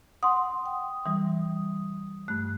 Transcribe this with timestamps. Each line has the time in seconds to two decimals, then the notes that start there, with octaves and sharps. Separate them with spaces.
0.23 F#5 C6 D#6
0.66 G5
1.06 E3 G3 D#6
2.28 G2 A3 F#6